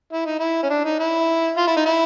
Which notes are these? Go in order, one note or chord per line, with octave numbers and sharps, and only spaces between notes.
E4
D#4
E4
C#4
D4
D#4
E4
F4
E4
D#4
E4